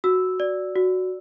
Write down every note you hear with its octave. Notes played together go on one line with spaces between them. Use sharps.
F#4 E6
D5
F#4